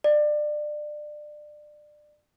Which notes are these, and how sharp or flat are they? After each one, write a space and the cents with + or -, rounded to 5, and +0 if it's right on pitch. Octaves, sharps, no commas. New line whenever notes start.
D5 +25